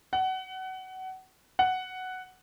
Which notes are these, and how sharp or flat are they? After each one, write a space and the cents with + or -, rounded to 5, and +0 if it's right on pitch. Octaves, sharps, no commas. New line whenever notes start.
F#5 +25
F#5 +5